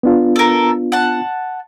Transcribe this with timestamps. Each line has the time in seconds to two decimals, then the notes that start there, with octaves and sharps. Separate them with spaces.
0.03 B3 D4 F4
0.36 A4 A#4
0.92 F#5 A5